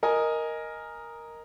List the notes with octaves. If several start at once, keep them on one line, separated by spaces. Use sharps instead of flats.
A#4 D#5 G#5